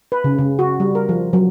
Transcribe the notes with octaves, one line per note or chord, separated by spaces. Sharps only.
B4
C#3
C#3
F#4
G3
A#4
F3
F#3